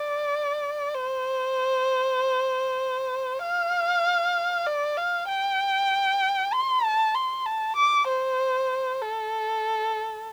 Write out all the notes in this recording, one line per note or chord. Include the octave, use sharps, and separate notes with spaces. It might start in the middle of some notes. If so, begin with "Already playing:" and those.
Already playing: D5
C5
F5
D5
F5
G5
C6
A5
C6
A5
D6
C5
A4